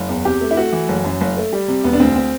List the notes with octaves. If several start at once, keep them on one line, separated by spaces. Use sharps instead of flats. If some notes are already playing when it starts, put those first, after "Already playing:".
Already playing: F#1
E2
C3 G4
A3
E4
A3 F#4
E3
F#1
F#2
F#1
A3
G3
C3
E1 B3
D4
D2 C4
C4